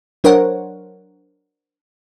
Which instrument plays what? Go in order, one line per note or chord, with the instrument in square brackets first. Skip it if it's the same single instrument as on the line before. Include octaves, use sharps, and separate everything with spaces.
[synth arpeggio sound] F#3 D4 A#4 C5 C#5 F#5